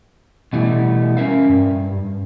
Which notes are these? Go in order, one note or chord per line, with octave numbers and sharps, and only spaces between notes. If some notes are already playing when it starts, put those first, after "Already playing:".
B2 E3 G3 A3
C#4 A#4 E5 F5
G2